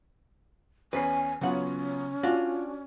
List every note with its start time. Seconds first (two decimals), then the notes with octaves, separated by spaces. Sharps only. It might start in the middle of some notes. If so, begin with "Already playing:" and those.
0.93 E2 C#4 B4 G#5 C7
1.41 C#3 F#3 B3 C#4 F4 F#5
2.23 D4 F4 F#4 D5